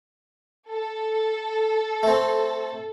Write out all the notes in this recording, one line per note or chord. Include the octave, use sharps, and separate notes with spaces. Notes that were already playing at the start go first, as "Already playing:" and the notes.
A4
A3 C4